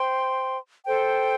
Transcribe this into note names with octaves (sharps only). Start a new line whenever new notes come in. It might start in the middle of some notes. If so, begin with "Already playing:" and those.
Already playing: C5 G5 C6
A4 C5 G5